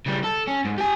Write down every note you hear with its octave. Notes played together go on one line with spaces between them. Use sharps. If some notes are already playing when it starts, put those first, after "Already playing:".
C#3 G3
A4
C#4
G#2
G4 G#5